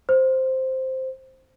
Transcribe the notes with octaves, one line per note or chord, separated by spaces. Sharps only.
C5